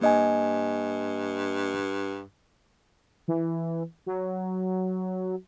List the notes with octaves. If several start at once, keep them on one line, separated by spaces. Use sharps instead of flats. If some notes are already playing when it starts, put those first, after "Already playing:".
G2 A#3 D#5 G#5
E3
F#3